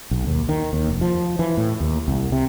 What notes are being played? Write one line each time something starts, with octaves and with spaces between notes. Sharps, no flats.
B1
D#2
D#3
D#2
F1
F3
E3
A2
D#2
C2
C3